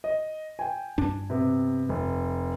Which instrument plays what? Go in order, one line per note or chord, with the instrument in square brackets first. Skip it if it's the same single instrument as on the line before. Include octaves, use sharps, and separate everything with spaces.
[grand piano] D#5
G5 G#5
[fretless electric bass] G2 D4
[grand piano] C3 B3
F1